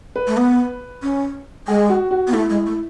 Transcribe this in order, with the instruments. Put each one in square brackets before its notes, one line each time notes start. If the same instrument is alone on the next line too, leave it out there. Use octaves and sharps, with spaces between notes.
[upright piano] B4
[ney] A3
B3
C#4
[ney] G#3 [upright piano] G#4
[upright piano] F#4
F#4
[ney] B3
[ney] A3 [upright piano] E4
[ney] G#3
A3